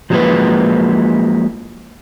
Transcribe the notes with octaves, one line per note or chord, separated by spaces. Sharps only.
F3 F#3 G#3 A#3 E4 B4